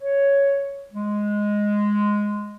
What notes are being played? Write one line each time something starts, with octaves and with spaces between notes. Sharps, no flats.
C#5
G#3